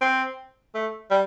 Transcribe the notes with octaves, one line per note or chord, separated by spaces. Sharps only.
C4
A3
G3